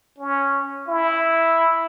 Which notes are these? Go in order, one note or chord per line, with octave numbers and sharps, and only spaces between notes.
C#4
E4